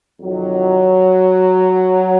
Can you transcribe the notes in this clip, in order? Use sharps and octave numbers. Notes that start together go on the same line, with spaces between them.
F2 C3 D#3 F#3